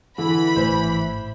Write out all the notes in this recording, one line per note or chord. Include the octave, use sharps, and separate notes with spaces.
D3 E3 B5
G#1 A2 A3 C5